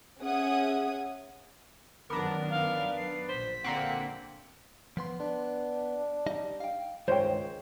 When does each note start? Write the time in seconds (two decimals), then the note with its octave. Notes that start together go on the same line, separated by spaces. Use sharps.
0.22 C#4 G#4 E5 F#5 D#6 G#6
2.10 F#2 D#3 F#3 B3 D4 A#4 A#5
2.50 F5
2.97 C7
3.29 A#1 C5 B6
3.64 D3 A#3 C4 F#5
4.97 F3 B3 C6
5.20 B3 D4
6.27 G3 D#4 D#5
6.60 F5 G5
7.08 C#2 G2 D#3 G#3 C5 C#5 G5